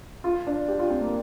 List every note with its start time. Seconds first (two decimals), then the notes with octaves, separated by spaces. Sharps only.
0.24 F4
0.47 D4
0.68 G4
0.79 F4
0.90 C4
1.01 A#3